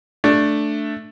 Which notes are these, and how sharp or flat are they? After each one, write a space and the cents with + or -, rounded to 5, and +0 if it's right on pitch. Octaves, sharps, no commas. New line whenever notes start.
A3 +0 D4 +0